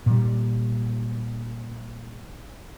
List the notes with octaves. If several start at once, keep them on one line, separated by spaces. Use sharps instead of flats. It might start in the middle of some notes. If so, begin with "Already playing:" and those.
A#2 G3